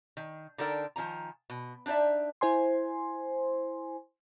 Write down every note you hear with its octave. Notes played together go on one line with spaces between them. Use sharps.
D#3
D3 D#4 A4 A#4 D5 G5
D#3 F3 G#5 A#5
B2
D4 D#4 C5 D5 E5
E4 C5 G#5 C6